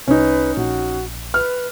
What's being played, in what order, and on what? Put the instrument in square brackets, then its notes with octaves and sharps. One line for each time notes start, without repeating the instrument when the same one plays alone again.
[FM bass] C2 [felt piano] C#4 D#4 [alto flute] B4
[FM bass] A#1 [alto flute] F#4
[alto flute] B4 [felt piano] F6